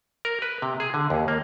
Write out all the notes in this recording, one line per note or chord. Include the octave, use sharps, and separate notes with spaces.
A#4
B4
C3
G#4
D3
D#2
A#3